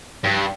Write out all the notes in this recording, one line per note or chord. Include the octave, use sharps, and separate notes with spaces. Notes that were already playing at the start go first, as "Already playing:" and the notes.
G2